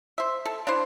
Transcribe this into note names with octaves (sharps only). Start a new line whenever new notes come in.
C5 E5
A4
D4 E4 C5